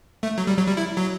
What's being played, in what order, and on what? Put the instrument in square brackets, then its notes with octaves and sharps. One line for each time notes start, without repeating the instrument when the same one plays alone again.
[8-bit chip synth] A3
F#3
G3
F#3
G3
E4
F#3